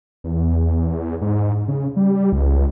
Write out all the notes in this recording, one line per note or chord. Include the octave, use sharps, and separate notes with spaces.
E2
G#2
C#3
G3
C#2